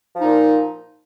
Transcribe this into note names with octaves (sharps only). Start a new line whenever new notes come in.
A#2 F3 D#4